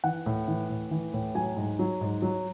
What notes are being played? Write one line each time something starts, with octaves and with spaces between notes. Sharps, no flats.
E3 F#5
A2
E3
A2
E3
A2
F#3 G#5
G#2
F#3
G#2
F#3